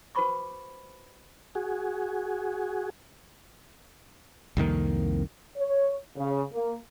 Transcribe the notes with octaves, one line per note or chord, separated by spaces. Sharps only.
F#4 B4 C5 B5 C#6 D6
F#4 G#4
C2 F2 D#3 A#3
C#5
C#3
A#3